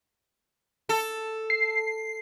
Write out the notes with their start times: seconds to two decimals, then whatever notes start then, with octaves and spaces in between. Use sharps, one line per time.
0.89 A4
1.50 C7